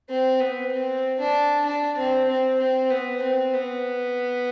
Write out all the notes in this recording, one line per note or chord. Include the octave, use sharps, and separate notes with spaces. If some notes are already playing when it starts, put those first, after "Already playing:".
C4
B3
C4
D4
D4
C4
C4
C4
B3
C4
B3